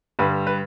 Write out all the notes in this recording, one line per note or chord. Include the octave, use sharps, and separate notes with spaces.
G2 D3 G3 B4
B4